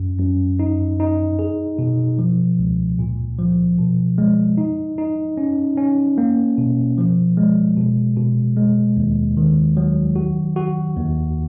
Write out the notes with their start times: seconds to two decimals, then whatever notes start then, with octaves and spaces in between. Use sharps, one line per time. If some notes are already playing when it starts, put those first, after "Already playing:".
Already playing: F#2
0.19 F#2
0.59 D#4
1.00 D#4
1.39 G#4
1.79 B2
2.19 F3
2.59 C#2
2.99 A#2
3.38 F3
3.78 B2
4.18 G#3
4.57 D#4
4.98 D#4
5.37 C#4
5.77 C#4
6.18 A#3
6.58 B2
6.98 F3
7.37 G#3
7.77 B2
8.17 B2
8.57 G#3
8.97 D#2
9.37 D#3
9.77 F#3
10.16 F#4
10.56 F#4
10.96 D#2